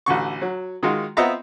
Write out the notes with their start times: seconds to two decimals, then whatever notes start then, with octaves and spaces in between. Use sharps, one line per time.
0.06 A1 D2 D3 C#6
0.42 F#3
0.83 D#3 G#3 D#4 F4 F#4
1.17 B3 C4 F4 D#5 E5 A#5